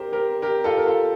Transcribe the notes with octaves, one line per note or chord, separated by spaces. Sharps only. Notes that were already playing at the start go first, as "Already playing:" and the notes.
Already playing: G4 A#4 C5
G4 A#4
G4 A#4
F4 A4
A#4
F4 A4